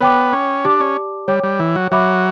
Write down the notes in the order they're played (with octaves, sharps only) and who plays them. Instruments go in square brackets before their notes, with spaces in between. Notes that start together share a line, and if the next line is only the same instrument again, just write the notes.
[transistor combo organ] B3 [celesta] C#5 G5 D6
[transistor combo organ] C#4
[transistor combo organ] D4 [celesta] G4 D5 A5 D6
[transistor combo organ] C#4
[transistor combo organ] G3 [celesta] C#5 G5 D6
[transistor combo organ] G3
E3
F#3
[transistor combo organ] F#3 [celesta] C#5 E5 B5 D6